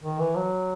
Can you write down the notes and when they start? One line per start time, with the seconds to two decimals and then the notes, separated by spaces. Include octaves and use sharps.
0.03 D#3
0.20 E3
0.37 F#3